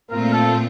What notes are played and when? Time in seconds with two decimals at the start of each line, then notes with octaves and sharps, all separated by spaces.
0.11 A#2 A3 C4 F4 A#4
0.33 A4